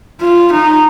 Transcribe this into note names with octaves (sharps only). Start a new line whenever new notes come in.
F4
D#4